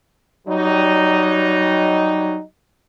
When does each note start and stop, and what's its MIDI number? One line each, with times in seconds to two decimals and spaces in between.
0.47 2.39 54
0.47 2.39 55
0.47 2.39 63